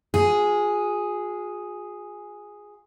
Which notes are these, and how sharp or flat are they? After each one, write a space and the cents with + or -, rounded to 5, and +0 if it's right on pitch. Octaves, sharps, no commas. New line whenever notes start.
F4 +45 G#4 +0